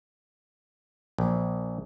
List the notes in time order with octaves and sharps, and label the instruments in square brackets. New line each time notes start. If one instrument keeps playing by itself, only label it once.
[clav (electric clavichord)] A#1